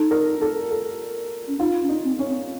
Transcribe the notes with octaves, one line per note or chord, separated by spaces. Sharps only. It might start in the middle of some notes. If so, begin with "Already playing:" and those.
Already playing: D#4 A4
A#4
A4
A4
C#4
D#4 F4
C#4
D#4
C4
C#4
C4